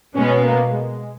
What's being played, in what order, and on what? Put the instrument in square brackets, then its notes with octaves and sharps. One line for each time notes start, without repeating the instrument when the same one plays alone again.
[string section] B2 G#3 B3 [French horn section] C#4
[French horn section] A#3
G#3